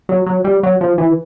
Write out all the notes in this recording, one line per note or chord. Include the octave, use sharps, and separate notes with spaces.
F#3
F#3
G3
F#3
F3
E3